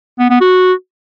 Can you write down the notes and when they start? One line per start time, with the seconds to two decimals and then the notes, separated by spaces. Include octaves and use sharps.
0.19 B3
0.30 B3
0.41 F#4